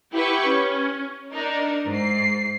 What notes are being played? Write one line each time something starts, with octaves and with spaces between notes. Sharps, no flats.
E4 G4 B4 F#5 G5 C#6
C#4
D4 D#4 A#4
G#2 C7